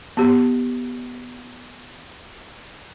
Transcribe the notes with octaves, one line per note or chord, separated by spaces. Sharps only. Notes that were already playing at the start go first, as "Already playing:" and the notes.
B3 G4